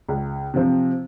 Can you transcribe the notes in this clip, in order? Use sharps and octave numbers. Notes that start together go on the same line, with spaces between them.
C#2
C3 F3 C4